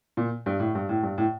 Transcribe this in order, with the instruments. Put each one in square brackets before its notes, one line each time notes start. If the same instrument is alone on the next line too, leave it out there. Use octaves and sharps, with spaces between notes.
[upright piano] A#2
G2
A2
G2
A2
G2
A2